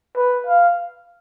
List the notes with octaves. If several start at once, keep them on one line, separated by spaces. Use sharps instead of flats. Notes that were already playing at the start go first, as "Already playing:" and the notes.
B4
F5